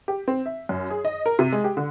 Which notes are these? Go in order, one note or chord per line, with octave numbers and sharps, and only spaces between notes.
G4
C4
E5
F#2
G#4
D#5
A#4
C3
G#3
G4
D3